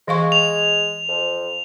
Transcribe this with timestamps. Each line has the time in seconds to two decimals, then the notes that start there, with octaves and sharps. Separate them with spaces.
0.08 E3 G#3 F5 C#6
0.32 F7
1.09 F2